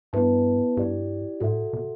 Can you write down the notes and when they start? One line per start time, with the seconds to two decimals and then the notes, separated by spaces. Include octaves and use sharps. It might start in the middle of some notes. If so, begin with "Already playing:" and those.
0.13 G2 B3 E4 B4 E5 A5
0.77 G2 E4 G4 D5
1.40 A2 F#4 A4 E5
1.73 B2